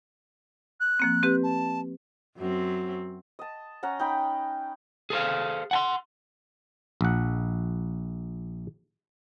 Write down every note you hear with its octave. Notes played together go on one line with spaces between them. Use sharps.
F#6
F3 A#3 C4
C4 G4 B4
A5
F#2 F#3 C4
D#5 A5
C#4 F#5 A#5
D#4 G5 B5
G#4 A4 C5 F5
F#5 G#5 C6
A#1 F#5